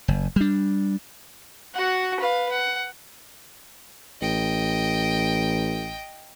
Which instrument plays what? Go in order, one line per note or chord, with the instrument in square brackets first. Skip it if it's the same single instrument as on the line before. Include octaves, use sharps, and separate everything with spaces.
[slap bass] F#1
G3 D4
[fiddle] F#4 F#5
B4 F5
F#5
[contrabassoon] A1 [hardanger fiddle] D#5 G5